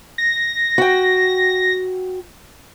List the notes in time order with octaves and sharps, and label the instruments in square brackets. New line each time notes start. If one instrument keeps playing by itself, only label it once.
[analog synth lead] A#6
[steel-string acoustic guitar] F#4 G5